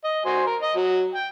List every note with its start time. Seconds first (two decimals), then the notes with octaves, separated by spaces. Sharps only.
0.04 D#5
0.25 F#4 C5 G#5
0.47 A#4
0.62 D#5
0.75 F#3
1.15 G5